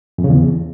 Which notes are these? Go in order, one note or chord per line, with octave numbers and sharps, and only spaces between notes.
F2
C#3
E2